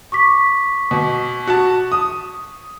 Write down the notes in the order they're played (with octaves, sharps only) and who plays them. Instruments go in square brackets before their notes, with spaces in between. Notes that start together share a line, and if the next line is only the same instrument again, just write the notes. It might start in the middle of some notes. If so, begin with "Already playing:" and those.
[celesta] C#6 D6 B6
[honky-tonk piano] B2
F#4 A5
D#6